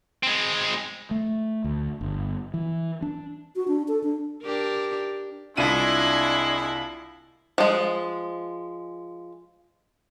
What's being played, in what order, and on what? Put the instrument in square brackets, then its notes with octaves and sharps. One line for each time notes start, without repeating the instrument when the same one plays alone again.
[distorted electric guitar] G#3 C4
[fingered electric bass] A3
D2
G1
E3
D4
[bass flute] F#4
D4
A4
D4
[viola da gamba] D4 G4 A#4
[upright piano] C2 F4 D#7 [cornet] G#3 [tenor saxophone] D4 [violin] E4
[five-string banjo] F3 G#3